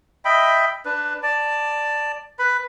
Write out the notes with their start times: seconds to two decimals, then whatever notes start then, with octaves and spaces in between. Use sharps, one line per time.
0.25 D#5 E5 G5 B5
0.86 D4 B4
1.23 D5 A5
2.39 B4 B5